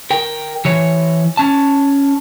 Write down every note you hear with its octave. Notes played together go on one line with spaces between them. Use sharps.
A#4 G5
E3 C#5
C#4 A5